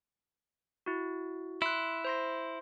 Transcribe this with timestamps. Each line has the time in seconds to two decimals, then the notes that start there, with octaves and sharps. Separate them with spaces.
0.86 E4 F#4
1.62 E4 C6 F#6
2.05 C5 C6 A#6